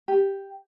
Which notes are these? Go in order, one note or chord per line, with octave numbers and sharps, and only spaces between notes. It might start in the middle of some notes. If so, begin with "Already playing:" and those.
G4